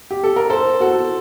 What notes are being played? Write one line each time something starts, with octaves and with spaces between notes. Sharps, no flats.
G4
A4
A#4
A4 C5
F#4 A4